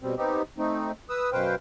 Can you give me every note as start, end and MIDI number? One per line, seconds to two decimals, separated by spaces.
0.02 0.15 47
0.02 0.15 55
0.02 0.15 60
0.17 0.42 59
0.17 0.42 60
0.17 0.42 63
0.17 0.42 67
0.58 0.92 57
0.58 0.92 60
0.58 0.92 63
1.09 1.30 71
1.09 1.30 87
1.09 1.30 88
1.32 1.55 42
1.32 1.55 47
1.32 1.55 71
1.32 1.55 72
1.32 1.55 77
1.32 1.55 79